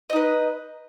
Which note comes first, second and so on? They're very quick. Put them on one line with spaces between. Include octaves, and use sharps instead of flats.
D#5 D#4 B4